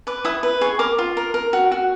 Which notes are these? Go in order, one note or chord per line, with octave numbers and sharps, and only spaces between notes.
B4 D6
E4 D#6
B4
G#4 C#6
A#4 D6
F4
A#4
A#4
F#4
F#4